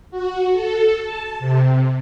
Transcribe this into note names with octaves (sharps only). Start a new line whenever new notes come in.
F#4
A4
A5
C3